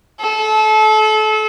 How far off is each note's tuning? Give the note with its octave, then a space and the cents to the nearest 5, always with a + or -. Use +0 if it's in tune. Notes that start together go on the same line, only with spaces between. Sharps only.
A4 -30